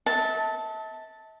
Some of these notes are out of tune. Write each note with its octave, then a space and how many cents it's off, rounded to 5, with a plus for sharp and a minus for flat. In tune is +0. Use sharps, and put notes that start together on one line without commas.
E5 -40 A5 +0